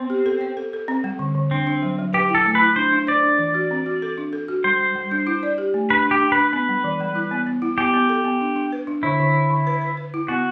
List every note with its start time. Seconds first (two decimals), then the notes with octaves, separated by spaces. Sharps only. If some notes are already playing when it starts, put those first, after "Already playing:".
Already playing: B3 C4
0.10 G4
0.26 A4
0.41 C5
0.57 A4
0.73 A4
0.88 C4
1.04 G3
1.19 D3
1.35 D3
1.51 C4 D4
1.67 D4
1.82 F#3
1.99 F#3
2.13 G4 B4
2.29 E4
2.35 A4
2.46 A3
2.55 B4
2.61 E4
2.76 D4 C5
2.92 D4
3.07 C5 D5
3.23 D4
3.39 E3
3.54 F#4
3.71 C4
3.86 F#4
4.02 A4
4.18 D4
4.33 A4
4.48 F#4
4.64 G3 C5
4.80 G3
4.95 G3
5.11 D4
5.27 E4
5.43 D5
5.58 G4
5.74 A3
5.90 D4 B4
6.06 D4
6.11 G4
6.22 D4
6.32 B4
6.37 D4
6.53 B3 B4
6.69 G3
6.84 E3
7.00 G3
7.15 E4
7.31 B3
7.47 B3
7.62 E4
7.78 B3 G4
7.94 B3
8.09 A4
8.25 B3
8.41 D4
8.56 D4
8.72 B4
8.87 D4
9.03 D3 E4
9.20 D3
9.34 D3
9.50 D3
9.67 B4
9.81 B4
9.97 B4
10.14 E4
10.28 B3 F#4